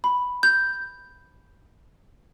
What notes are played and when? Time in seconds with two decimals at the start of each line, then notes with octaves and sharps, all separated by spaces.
0.04 B5
0.43 G6